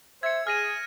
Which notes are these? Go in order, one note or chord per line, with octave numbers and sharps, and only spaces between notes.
C5 E5 G#6 C#7
G#4 F6 A#6 D#7